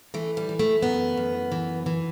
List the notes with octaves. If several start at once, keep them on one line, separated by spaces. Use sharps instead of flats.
E3 A3
G3
E3
A3
F#2 B3
F#2
E3
E3